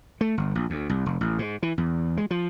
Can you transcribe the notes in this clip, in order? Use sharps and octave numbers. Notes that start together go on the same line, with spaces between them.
A3
G1
A#1
D2
C2
F1
A1
G#2
E3
E2
G#3
F3